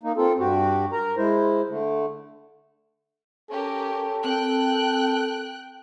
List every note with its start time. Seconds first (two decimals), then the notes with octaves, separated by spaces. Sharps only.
0.03 A#3 D#4
0.17 C4 F4 A4
0.39 G2 F#4 G4
0.92 A#4 A#5
1.17 G#3 E4 C5
1.69 D3 A3
3.50 C#4 G4 A4 A#4
4.24 C4 A#4 G5 F#6